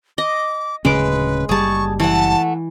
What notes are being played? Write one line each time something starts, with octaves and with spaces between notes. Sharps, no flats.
D#5 D6
D1 C#3 G#3 C#4 B4 D6
F#1 G3 G#4 A5 C#6
E3 A3 F#5 A5